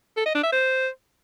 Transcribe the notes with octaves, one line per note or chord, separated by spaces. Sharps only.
A4
D#5
D4
E5
C5